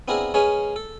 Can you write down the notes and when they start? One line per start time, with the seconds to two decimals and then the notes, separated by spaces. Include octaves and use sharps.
0.08 B3 C4 D4 E4 G#4 A#4
0.34 G#3 C#4 G#4 B4 C#5 F5
0.76 A4